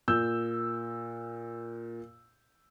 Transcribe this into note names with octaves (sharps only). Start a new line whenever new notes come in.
A#2 E6 G6